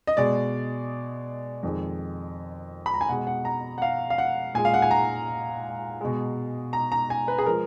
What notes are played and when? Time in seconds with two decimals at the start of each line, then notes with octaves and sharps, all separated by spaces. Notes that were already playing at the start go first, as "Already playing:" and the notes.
0.07 D#5
0.17 B2 G#3 D5
1.63 F2 D#3 G#3
2.86 B5
2.94 A#5
3.01 G#5
3.09 B2 G#3 F#5
3.27 F#5
3.45 A#5
3.78 F#5
3.82 F5
4.10 F5
4.18 F#5
4.54 A#2 G#3 G#5
4.65 F5
4.74 F#5
4.82 G#5
4.91 A#5
6.01 B2 G#3
6.73 A#5
6.92 A#5
7.10 G#5
7.28 B4
7.38 G#4
7.46 F3 G#3 A#4